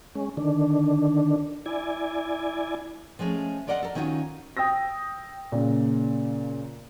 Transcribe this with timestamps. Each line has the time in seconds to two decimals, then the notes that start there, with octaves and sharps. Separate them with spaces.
0.15 G#3 C#4
0.37 D3 D#3 D4
1.66 E4 D5 G#5
3.19 F3 G#3 A3 C#4
3.67 F4 A#4 D5 D#5 F5 F#5
3.83 A4 A#4
3.95 D#3 C#4 D#4 F4 F#4
4.57 G5 D#6 E6 A#6
5.52 A#2 C#3